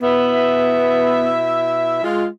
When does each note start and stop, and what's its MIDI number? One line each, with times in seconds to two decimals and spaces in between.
0.02 1.99 47
0.02 1.47 59
0.02 1.99 64
0.02 1.99 76
2.03 2.26 56
2.03 2.26 65